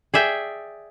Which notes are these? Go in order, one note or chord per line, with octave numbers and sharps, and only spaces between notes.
G#4 D5 E5 G5